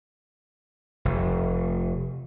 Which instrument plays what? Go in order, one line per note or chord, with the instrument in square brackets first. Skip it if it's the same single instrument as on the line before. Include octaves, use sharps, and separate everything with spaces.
[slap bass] F1